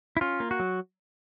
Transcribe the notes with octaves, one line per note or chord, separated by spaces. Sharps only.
E4
C#4 F4
A#3
F#4
F#3